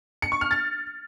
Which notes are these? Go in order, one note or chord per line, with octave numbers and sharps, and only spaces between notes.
C#7
C#6
F6
A6